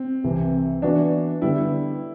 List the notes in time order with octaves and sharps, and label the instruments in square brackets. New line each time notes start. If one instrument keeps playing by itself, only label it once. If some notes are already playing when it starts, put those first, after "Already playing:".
Already playing: [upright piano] C4
[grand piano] C2 C3 E3
[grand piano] E3 B3 F#4 [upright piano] D4
[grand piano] D3 G3 B3 [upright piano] E4